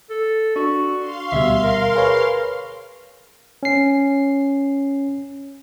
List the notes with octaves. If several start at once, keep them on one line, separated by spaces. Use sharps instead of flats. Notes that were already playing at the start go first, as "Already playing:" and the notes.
A4
D4 F#4
F5 C6
D2 B2 G3 E5
A#4
G#4 B4 C#5
C#4 C7